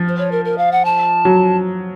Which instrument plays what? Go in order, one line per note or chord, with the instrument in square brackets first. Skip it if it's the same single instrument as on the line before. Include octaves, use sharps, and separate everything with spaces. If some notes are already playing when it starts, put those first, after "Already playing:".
Already playing: [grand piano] F3
[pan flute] C5
C#5
A#4
A#4
F5
F#5
A5
[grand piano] F#3